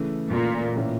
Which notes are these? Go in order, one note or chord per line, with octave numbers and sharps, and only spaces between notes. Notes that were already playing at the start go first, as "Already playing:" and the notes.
Already playing: C#3 E3 A3
A#2
A2 E3 A#3 C#4 F4